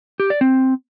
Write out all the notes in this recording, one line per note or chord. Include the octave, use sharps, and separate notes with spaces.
G4
D5
C4